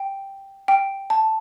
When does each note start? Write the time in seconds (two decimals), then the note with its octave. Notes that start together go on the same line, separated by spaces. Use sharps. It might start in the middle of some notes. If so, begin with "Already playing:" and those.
Already playing: G5
0.68 G5
1.10 A5